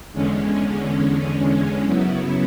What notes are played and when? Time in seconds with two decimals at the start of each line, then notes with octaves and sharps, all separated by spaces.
0.13 E2 D3 G#3 C#4
1.84 F#2 C#3 F#3 B3 E4